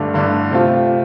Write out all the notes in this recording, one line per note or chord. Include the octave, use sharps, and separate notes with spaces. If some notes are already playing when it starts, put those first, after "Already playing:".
Already playing: G2 D3 A3 D4
G2 D3 A3 D4
C3 A3 C4 F4